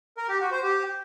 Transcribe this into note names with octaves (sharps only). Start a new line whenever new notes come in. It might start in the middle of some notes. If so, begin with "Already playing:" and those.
A#4
G4
F#4
C5
G4